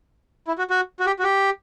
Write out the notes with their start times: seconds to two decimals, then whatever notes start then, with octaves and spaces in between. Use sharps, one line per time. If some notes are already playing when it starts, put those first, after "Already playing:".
0.47 E4
0.58 F#4
0.70 F#4
1.00 F#4
1.06 G4
1.19 F#4
1.23 G4